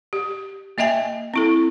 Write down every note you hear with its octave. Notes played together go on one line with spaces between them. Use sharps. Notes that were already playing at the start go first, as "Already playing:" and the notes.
G4
A#3 D#5 E5 G5 G#5
C4 E4 A4